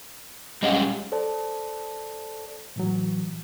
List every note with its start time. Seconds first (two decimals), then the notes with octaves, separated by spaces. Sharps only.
0.63 G3 G#3 C#4 D#5 F5 F#5
1.12 A4 C5 D5 A5
2.76 A2 E3 F#3